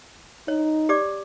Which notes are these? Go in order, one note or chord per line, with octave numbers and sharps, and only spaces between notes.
D#4 C#5
G4 D5 D6